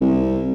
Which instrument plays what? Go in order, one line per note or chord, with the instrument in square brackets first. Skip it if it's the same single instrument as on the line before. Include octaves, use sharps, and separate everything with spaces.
[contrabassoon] C2